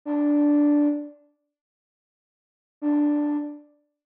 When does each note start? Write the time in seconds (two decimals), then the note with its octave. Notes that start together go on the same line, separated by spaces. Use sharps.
0.05 D4
2.82 D4